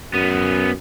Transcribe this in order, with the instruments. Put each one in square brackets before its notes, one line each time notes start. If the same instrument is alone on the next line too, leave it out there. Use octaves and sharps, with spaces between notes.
[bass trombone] F#2 [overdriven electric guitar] B3 C#4